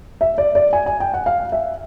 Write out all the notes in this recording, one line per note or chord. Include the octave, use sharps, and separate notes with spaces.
E5
D5
D5
G#5
G#5
G5
F#5
F5
E5